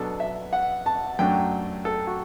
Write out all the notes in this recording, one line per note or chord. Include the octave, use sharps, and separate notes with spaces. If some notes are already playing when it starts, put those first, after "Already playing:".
Already playing: B2 F#3 B3 D4 A4
E5
F#5
A5
F#2 F#3 A3 D4 G5
A4
F#4